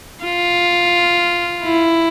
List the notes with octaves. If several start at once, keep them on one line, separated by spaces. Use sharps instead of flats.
F4
E4